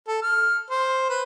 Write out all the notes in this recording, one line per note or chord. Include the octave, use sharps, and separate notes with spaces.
A4
F6
C5
B4